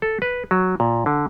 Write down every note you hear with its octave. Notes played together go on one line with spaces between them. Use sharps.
A4
B4
F#3
A#2
D3